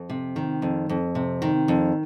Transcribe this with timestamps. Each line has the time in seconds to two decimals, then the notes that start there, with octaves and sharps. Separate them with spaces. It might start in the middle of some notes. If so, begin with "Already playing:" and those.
Already playing: F2
0.09 C3
0.36 D#3
0.62 F2
0.89 F2
1.15 C3
1.42 D#3
1.68 F2